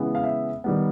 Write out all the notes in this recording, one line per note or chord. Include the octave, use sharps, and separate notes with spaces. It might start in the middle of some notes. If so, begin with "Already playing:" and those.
Already playing: C#3 E3 G#3 B3
F5
E5
D#3 G3 B3